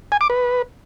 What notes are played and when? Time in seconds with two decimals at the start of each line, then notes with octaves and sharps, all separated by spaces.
0.12 G#5
0.21 D6
0.30 B4